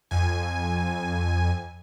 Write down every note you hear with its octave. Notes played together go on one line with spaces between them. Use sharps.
F2 G#5